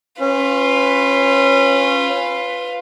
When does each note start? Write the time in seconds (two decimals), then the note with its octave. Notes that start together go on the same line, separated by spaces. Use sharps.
0.20 C#4 F4 B4